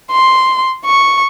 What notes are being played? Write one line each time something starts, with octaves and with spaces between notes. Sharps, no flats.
C6
C#6